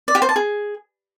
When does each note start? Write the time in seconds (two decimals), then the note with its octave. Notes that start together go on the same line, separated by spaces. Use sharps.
0.08 D5
0.15 G4
0.22 C5
0.29 A5
0.36 G#4